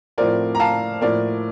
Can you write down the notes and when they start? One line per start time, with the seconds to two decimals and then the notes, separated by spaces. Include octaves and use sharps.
0.18 A2 F3 C4 F4 A#4 D5
0.55 A#5
0.60 F5 A5
1.01 A2 F3 A#3 F4 A#4 D5